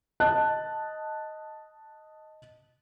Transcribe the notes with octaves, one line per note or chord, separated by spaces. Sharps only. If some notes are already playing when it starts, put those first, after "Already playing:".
D#5 A5 F#6